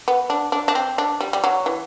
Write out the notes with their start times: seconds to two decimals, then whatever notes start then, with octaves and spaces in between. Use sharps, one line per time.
0.08 B3
0.30 D4
0.52 D4
0.68 D4
0.75 C4
0.98 D4
1.21 G3
1.33 G3
1.44 F#3
1.66 E3